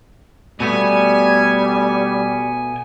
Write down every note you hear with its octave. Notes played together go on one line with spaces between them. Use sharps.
B2 G3 A3 B3 G#5